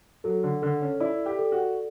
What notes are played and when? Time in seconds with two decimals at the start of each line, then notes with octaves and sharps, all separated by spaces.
0.24 F#3 A4
0.43 D3
0.62 D3 A4
0.81 C#4
1.00 E4 D5
1.26 G4
1.39 A4
1.52 F#4